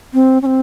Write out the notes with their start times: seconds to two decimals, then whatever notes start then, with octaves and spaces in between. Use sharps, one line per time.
0.14 C4
0.42 C#4
0.46 C4